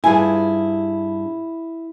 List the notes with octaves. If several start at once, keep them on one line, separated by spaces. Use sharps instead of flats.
G2 E4 F4 G#4 G#5